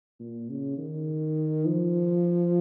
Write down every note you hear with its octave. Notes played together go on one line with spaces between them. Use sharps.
A#2
C#3
D#3
F3